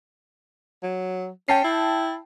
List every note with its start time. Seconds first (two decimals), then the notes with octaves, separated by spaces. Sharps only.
0.83 F#3
1.49 C#4 G5 A5 C7
1.64 E4